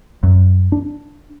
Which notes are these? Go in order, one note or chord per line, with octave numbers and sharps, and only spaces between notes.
F#2
D4